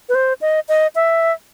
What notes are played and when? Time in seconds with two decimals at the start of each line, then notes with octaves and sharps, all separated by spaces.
0.09 B4
0.15 C5
0.41 D#5
0.69 D#5
0.95 E5